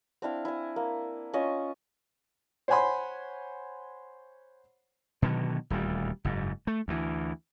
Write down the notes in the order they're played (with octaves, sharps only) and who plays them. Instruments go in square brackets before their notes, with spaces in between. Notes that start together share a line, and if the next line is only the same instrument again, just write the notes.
[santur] C4 D4 E4 F5
E4 G#5
A#3
C#4 F4 D#5 C#6
[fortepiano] C5 C#5 F#5 G#5 B5 C6
[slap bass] B2 D3 D#3 F#3
D#1 D2 G3
F#1 G#2
A3
D2 E3